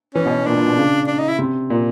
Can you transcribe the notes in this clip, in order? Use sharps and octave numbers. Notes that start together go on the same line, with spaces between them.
E3 C#4
B2
A#2 D4
A#2
B2
C#3
D4
D#4
E4
C3
A#2